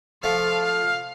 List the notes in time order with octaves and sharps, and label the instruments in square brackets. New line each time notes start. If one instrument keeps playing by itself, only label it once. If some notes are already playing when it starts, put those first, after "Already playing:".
[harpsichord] F3 A3 [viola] F5
[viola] F5